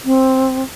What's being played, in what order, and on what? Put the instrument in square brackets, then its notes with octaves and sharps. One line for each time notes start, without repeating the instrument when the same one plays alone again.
[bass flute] C4